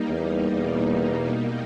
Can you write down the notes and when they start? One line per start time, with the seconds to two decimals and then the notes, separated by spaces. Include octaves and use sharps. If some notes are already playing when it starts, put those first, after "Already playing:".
Already playing: G3 A#3 D#4
0.08 E2
0.51 E2 B2 G3 A#3 D#4